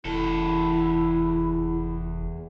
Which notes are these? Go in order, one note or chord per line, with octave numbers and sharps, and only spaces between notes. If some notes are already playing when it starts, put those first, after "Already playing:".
F1 E2 E4 A4